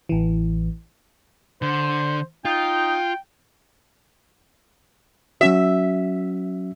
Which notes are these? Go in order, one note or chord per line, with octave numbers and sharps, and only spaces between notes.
A1 E3
D3 C5
D#4 F4 G5
F#3 C#4 F#4 E5